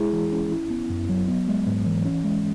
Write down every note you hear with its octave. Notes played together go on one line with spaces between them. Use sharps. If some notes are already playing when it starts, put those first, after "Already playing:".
Already playing: G#3 E4 G#4
E3
C#4
E4
B3
F#2
F#3
B3
G#3
G#2
E3
C#4
G#3